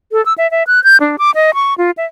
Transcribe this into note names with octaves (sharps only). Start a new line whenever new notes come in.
A4
E6
E5
E5
F#6
G6
D4
D6
D#5
C#6
F4
E5